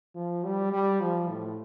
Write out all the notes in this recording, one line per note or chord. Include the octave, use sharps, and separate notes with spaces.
F3
G3
G3
F3
A2